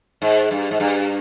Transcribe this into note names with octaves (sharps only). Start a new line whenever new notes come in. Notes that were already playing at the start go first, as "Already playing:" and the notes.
G#2
G2
G#2
G2